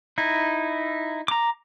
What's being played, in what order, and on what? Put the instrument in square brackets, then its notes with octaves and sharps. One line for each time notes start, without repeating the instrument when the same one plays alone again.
[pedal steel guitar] D#4 E4
A#5 D6